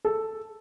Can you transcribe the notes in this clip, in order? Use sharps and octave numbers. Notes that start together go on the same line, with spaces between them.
A4